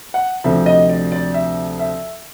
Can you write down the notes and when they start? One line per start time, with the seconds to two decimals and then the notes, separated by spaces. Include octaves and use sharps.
0.14 F#5
0.44 D2 C3 F3 E5
0.66 D#5
0.89 D5
1.12 D5
1.34 E5
1.79 E5